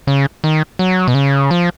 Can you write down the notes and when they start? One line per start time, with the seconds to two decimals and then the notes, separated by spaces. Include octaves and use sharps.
0.07 C#3
0.44 D#3
0.79 F#3
1.08 B2
1.14 C#3
1.51 F3